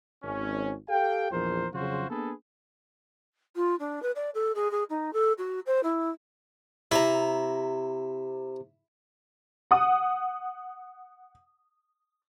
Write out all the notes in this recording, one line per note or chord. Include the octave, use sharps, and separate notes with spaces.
G#1 C#4
G4 A4 F5 G5
A#1 E2 F3 A#4 C5
F2 C#3 F#3 F4 F#4 C5
A#3 B3 D4 G#4 A4 B4
F4
D4
B4
D5
A4
G#4
G#4
D#4
A4
F#4
C5
E4
C3 E4 G4 A#5
F#5 D#6